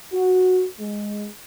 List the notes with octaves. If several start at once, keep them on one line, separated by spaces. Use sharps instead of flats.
F#4
G#3